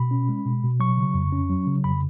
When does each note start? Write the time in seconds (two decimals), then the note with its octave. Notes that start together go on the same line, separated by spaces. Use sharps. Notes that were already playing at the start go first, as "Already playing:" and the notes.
Already playing: B2 B5
0.11 C#4
0.29 G#3
0.46 B2
0.63 B2
0.80 F#3 C#6
0.97 C#3
1.14 F2
1.33 C#4
1.50 F#3
1.66 C#3
1.84 F2 B5